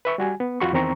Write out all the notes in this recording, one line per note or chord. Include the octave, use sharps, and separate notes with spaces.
B4 E5 C#6
G3 F#4 G#5
B3
F2 F4 F#4 B5 C#6
E2 D#3 C4 A#5 C#6